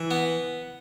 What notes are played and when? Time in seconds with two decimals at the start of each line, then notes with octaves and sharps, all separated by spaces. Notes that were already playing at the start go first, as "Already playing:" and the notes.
Already playing: E3
0.11 B3